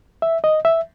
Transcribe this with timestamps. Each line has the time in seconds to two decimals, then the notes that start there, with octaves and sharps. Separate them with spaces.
0.22 E5
0.44 D#5
0.65 E5